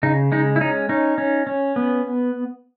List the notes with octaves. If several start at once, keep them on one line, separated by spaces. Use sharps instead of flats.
C#3 D#4
G#3 D#4
E4
C#4 D#4
C#4 D#4
C#4
C#4
B3